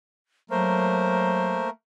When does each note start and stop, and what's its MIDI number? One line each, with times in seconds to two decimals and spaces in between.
0.50 1.65 54
0.50 1.70 57
0.50 1.70 58
0.50 1.70 70
0.50 1.68 72